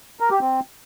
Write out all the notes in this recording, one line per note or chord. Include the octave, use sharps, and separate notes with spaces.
A#4
G4
C4